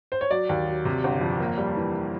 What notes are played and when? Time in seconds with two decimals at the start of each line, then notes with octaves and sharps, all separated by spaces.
0.12 C5
0.21 C#5
0.31 F#3 D5
0.49 D#2
0.67 F#3
0.85 C3
1.04 G1
1.21 F2
1.40 A#3
1.58 G3
1.77 E3